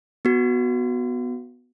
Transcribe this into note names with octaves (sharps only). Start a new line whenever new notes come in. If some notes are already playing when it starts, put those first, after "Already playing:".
B3 F#4